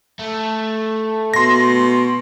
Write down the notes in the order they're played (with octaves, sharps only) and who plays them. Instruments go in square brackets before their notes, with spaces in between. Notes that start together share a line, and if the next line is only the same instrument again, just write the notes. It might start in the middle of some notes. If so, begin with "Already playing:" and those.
[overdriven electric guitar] A3
[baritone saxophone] B2 [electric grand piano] C6 A#6